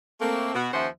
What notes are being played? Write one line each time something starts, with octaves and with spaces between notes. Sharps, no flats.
A3 A#3 C4
B2 F#4
D#2 F3 C#4 C5 E5 F#5